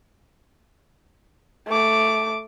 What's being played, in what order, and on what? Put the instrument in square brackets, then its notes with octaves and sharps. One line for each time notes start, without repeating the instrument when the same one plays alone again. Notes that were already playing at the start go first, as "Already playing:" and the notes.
[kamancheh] A3 D6